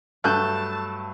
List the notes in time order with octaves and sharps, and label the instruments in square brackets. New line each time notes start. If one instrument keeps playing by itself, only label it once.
[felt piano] G2 F#3 [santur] A3 [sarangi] A5 [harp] F#6 G6